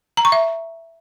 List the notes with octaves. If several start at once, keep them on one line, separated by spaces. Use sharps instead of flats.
A#5
C#6
E5